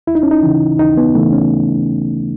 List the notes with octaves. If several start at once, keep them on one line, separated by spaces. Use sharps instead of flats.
D#2 E4
D#4
C#4
D#4
C#3 E3
D#2 D#4
B3
C#3 E3 A3
C#4